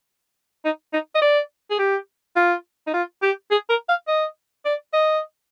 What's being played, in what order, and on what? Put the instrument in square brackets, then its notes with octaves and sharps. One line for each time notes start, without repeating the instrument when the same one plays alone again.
[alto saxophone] D#4
D#4
D#5
D5
G#4
G4
F4
D#4
F4
G4
G#4
A#4
F5
D#5
D5
D#5